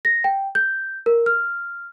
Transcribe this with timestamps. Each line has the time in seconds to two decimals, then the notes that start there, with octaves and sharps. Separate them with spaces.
0.05 A#6
0.24 G5
0.55 G6
1.06 A#4
1.26 F6